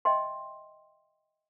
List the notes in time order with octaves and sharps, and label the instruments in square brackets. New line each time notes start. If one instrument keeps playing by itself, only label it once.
[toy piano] D#5 E5 G5 C6